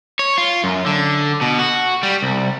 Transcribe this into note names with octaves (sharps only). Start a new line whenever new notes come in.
C#5
F4
F#2
D3
B2
F#4
G3
C2